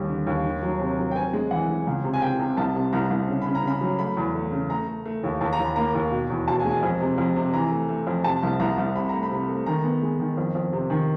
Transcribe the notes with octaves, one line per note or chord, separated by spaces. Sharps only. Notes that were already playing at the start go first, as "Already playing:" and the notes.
Already playing: D#2 D#3 G3
D3
D#2
D#3
F#3
C3
F#3
G5
C4 G#5
G#3
E3 F#5
G#3
C#2
C3
G#5
C3 G5
C3
C2 A5
C3
C2 A#5
C2
C#3
C#3 B5
A#5
C#3 B5
F#3
A3 B5
E2
A3
C#3
A3 A#5
A3
A3
D#2
D#2 A5
A#5
D#2
B5
A#3 A#5
D#2
B2
E2
B2 A5
G#5
G#3
G#5
F2 G#5
C3
F2
C3
E3 A#5
A3
A3
F2
C3 A5
C2
C2 A#5
C2
C3 B5
A3 A#5
B5
C3
A3
D#3 A#5
B3
G#3
D#3
F2
F2
C3
D#3